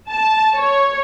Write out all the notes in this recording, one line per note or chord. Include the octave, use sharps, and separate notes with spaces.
A5
C#5